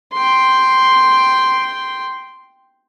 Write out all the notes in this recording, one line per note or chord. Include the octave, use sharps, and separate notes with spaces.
G5 C6